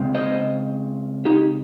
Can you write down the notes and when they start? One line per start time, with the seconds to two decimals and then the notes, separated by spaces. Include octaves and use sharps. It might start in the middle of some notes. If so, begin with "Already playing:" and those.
Already playing: C#3 G#3 C4
0.14 C5 D#5
1.25 D#4 G4